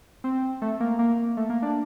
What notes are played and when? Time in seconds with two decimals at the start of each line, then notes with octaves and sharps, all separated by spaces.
0.24 C4
0.62 A3
0.80 A#3
0.99 A#3
1.37 A3
1.50 A#3
1.62 D4